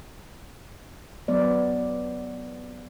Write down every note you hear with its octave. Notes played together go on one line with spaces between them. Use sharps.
F#3 B3 D5